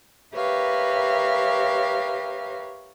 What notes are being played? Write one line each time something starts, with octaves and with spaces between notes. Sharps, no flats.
G4 A#4 B4 C#5 E5 F5